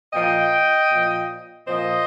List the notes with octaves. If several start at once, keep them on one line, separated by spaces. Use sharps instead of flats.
A#2 F3 D#5 G5
A#2 F3
A#2 F3 C5 D#5